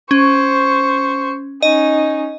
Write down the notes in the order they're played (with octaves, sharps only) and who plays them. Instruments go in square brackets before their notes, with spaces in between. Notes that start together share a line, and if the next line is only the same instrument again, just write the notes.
[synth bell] C#4 [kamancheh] C5 C#6
[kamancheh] C#4 D#4 [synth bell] D#5